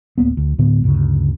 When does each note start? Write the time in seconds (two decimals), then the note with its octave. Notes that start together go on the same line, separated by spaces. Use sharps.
0.18 D1 A#3 B3
0.37 D2
0.58 D2 A2 D3 B3
0.84 D2 G2 C#3